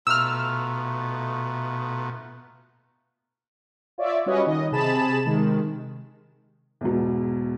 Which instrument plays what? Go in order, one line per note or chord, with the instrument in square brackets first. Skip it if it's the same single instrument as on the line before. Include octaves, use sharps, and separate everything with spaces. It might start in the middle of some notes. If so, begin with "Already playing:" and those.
[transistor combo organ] B2 [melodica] A3 D#4 F4 [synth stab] E6 F6
[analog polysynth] F4 C#5 D5 E5
G3 C#4 F#4 B4 C#5 D#5
D#3 D#5
C3 G#4 A5 B5 E7
C3 D#3 G#3
[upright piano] E2 G#2 B2